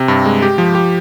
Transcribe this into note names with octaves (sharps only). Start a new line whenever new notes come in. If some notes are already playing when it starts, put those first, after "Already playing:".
Already playing: C3
G2
G#3
G4
F3
G4